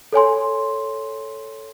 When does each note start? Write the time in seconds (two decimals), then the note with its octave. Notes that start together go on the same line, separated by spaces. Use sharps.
0.13 A4 C#5 G#5 C6